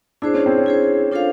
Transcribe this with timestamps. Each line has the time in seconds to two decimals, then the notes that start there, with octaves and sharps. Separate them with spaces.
0.22 D4 E4 G#4 C5
0.34 C#4
0.46 C4
0.58 C#4
0.66 E4 G#4 C5
1.12 D4 F4 A4 C5 F5